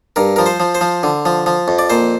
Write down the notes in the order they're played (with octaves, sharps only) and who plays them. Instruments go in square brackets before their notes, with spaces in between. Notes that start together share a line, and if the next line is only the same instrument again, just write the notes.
[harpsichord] G2 A#4
F3 A#4
C5
F3
C5
F3
D3
F3
F3
F2
D5
A#2 C5